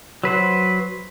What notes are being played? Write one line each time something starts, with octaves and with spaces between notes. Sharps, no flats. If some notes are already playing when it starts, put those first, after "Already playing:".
F#3 B4 C5